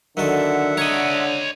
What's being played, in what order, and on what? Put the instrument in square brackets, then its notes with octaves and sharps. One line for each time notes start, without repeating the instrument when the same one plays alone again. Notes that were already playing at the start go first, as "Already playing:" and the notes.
[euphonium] D3 [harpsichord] D#3 F#3 A4 [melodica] E5 F#5
[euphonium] D3 [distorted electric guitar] C#5 D#5 [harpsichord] A#5